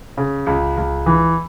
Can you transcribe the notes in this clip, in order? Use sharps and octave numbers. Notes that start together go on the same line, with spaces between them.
C#3
C#2
C#2
E3